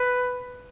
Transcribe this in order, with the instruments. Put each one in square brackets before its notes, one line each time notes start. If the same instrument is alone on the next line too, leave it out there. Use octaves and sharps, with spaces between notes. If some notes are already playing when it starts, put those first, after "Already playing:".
Already playing: [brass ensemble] B4